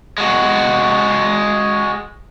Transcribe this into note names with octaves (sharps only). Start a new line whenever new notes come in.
G#3 F#4